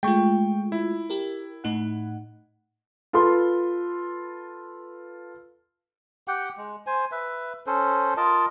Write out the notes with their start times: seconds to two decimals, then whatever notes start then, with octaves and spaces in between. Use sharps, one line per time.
0.03 G#3 A3 F4 G5 C#6
0.72 E4
1.10 G4 A#4
1.64 A2 D#4 F#5
3.13 F4 A4 B4 B5 C6
6.28 G4 F#5 G5
6.57 G#3
6.87 C5 G#5
7.12 B4 E5
7.67 C#4 A4 C5
8.17 F4 A#4 D#5 A5